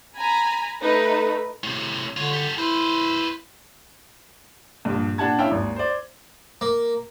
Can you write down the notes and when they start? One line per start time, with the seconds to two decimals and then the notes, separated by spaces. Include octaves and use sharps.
0.16 G#5 A#5 B5
0.81 A3 D#4 B4
1.64 A2 C3
2.17 D3 F4 C#5
2.33 G4 A4
2.58 E4 B4 C5
4.85 A#1 G2
5.18 A#2 D4 G4 F#5 A5 G#6
5.39 C#4 E4 E5 F5 G5
5.51 G#1 D#2
5.76 C5 D5
6.61 A#3